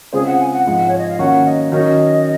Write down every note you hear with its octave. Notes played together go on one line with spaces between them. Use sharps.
C#3 G#3 C4 F4 G#4 C5
F#5
G#5
F#5
G#2 F3 G#3 F#5
C#5
D#5
F5
D#3 F#3 A#3 C#4 F#4 F#5
D#5
D#3 F#3 C#4 D#5